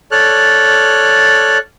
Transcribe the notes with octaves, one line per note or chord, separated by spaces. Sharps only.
A4 C#5 D5 F6 F#6